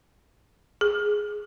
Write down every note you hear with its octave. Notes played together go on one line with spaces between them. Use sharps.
G#4